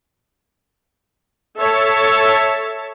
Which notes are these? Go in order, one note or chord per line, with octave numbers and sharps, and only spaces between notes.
A4 C#5 E5 A5